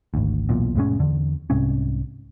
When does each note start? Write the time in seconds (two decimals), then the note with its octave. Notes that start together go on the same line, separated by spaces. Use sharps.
0.14 G#1 D2
0.49 B1 E2 A#2
0.75 F1 A2 G#3 C#4
0.99 E2 D3
1.50 C2 G#2 C3 C#4